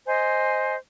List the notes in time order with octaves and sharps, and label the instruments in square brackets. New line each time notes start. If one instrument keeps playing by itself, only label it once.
[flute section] C5 D#5 G#5